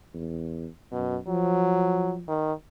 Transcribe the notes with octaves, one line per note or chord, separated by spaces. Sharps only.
E2
F#2 B2
F3 F#3
D#3